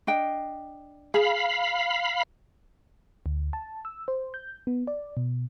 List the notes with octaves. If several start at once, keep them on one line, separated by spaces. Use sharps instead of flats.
D4 D#5 G5
G#4 F5 B5
D2
A5
E6
C5
G6
B3
D5
B2